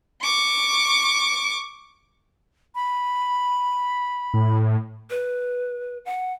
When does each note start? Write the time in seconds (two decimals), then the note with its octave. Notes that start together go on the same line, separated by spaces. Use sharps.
0.22 C#6 D6
2.75 B5
4.34 A2
5.10 B4
6.05 F#5